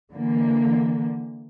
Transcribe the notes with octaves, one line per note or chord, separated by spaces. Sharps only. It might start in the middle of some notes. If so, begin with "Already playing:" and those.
D3 E3 A#3